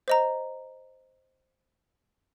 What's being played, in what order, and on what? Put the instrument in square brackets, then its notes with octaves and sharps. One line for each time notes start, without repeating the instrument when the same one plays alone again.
[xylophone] C5 D#5 A#5